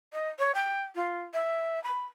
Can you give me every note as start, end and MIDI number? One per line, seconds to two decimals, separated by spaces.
0.13 0.29 75
0.39 0.52 73
0.54 0.82 79
0.95 1.20 65
1.34 1.82 76
1.84 2.04 83